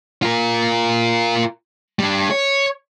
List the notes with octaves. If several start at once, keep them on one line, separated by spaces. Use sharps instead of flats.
F4 A#4
G3 D4
C#5